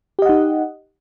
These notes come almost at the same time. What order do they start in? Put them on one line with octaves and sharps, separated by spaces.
G4 D#5 F#5 D#4